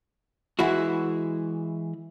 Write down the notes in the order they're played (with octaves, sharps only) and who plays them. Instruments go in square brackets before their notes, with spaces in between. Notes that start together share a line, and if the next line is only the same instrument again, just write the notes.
[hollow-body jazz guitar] E3 G#3 E4 F#4